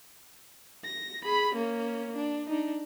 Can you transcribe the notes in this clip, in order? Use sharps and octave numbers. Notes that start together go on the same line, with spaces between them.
A#6
G#4 B5
A#3 C#4
D4
D4 D#4